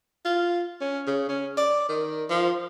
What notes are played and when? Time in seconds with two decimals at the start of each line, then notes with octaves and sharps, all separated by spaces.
0.25 F4
0.81 C#4
1.07 C#3
1.29 C#4
1.57 D5
1.89 D#3
2.29 F3